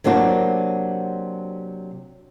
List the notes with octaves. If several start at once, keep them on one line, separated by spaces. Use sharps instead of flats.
C3 F#3 A#3 D4 F#4